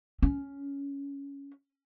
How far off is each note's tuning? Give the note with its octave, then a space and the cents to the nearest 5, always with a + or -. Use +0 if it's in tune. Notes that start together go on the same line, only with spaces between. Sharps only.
C#4 +10